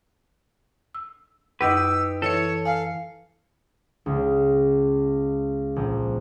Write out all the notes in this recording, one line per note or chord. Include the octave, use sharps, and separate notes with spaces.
E6
F#2 D#4 G4 B4 E6
E3 A4 C#5 C#7
F5 G#5
C#2
A#1